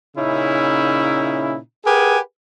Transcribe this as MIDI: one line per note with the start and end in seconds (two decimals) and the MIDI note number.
0.17 1.57 46
0.17 1.57 49
0.17 1.57 61
0.17 1.57 63
0.17 1.57 64
1.85 2.19 67
1.85 2.19 68
1.85 2.19 70
1.85 2.19 71
1.85 2.19 78
1.85 2.19 80